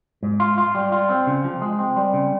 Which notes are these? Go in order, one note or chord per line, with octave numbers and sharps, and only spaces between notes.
G#2
F4
F4
G3
F4
C4
C#3
F3
G#3
C4
G3
C#3